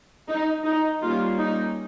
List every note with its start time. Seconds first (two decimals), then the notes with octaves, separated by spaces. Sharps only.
0.28 D#4
0.64 D#4
1.01 G3 A#3 C#4 F4
1.38 D#4